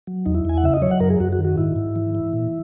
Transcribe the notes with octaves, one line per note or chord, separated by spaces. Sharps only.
F#3
E2 D#4
E4
E2 G#5
F#5
C#3 E5
D#5
F#3 C#5
F#5
F#2 A#4
G#4
F#2 F#4
F#4
D#3
F#4
G#2 E4
G#2
E3
E3
A#2